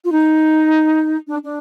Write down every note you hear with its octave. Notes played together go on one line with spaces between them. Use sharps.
F4
D#4
D4
D4